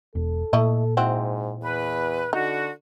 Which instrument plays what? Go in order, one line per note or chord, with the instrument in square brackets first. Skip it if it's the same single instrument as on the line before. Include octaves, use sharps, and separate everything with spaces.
[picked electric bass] E1 [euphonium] A4
[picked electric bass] A#2 [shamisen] A3 E4 D#5
[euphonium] G#2 [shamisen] C4 E4 F#4
[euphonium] E2 [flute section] B4
[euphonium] D3 [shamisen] D#4 [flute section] F#4